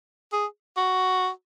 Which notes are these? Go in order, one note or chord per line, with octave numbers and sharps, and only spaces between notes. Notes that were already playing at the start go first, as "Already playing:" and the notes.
G#4
F#4